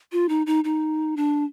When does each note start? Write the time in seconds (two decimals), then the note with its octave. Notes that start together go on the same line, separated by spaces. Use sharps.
0.12 F4
0.29 D#4
0.47 D#4
0.64 D#4
1.17 D4